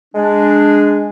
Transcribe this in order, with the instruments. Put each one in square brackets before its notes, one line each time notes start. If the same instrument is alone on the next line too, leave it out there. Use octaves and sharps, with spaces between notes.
[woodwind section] G#3 D4